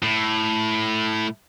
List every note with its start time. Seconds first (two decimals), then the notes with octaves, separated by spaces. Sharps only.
0.02 A2